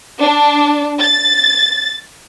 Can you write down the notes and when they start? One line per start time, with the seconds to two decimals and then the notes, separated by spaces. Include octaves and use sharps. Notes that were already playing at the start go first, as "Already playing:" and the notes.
0.21 D4
1.01 A6